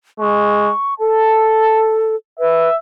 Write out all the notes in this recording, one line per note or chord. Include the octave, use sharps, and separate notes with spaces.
G#3 C#6
A4 A5
B4 E5